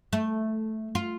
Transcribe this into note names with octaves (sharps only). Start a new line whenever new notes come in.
A3
F4